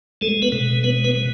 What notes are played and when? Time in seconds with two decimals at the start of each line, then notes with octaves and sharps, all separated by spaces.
0.21 G#3 A3 A4
0.42 B3 B4
0.52 B2
0.83 G#3 B3 B4
1.04 B3 B4
1.15 G#3